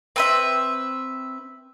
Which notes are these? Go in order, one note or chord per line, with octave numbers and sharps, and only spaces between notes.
C4 B4 E5